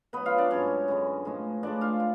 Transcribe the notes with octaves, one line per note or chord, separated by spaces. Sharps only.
B2 F#3 B3 B4
F4 F5
D4 D5
G#2 F#3 C#4 C#5
F#2 D3 G#3
A2 F3 G#3
A2 F3 G#3 D4 D5
F4 F5
D5